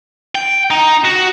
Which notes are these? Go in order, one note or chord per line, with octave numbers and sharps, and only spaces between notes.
G5
D#4
F#4